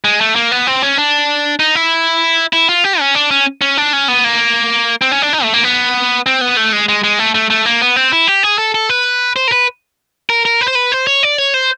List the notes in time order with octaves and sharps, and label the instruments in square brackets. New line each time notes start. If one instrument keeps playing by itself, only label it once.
[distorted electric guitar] G#3
A3
A#3
B3
C4
C#4
D4
D#4
E4
E4
F4
G4
C#4
D4
C#4
C#4
D4
C#4
B3
A#3
C4
C#4
D4
D#4
A3
A#3
B3
C4
B3
A3
G#3
G#3
G#3
A3
A3
A3
A#3
B3
C4
E4
G4
G#4
A4
A4
B4
C5
A#4
B4
A#4
A#4
B4
C5
B4
C5
C#5
D5
C#5
C5